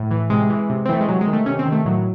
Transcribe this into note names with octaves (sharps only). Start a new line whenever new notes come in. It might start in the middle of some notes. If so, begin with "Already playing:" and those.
Already playing: A2
E3
C3 G#3
E3
C3
C4
E3 A3
G#3
C3 F#3
G#3
D#3
A3
C3 C#4
C4
D#3
A3
A2 F#3